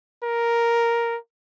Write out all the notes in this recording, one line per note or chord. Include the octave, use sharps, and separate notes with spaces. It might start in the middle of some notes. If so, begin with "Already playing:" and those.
A#4